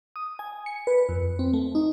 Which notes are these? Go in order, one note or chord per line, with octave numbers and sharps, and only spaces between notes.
D#6
G#5
C#7
B4
F2
C4
A3
D#4